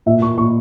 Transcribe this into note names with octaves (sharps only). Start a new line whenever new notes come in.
A#2 E5
A#2 C#6
A#2 C#6